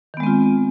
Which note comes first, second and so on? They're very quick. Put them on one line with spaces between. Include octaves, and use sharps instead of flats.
D#3 B3 G#3 C4 F4